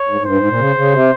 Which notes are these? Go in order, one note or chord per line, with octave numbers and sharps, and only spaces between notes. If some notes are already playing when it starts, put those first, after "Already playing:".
Already playing: C#5
G#2
G#2
G2 C5
G#2
A#2
C#3
C#3
C3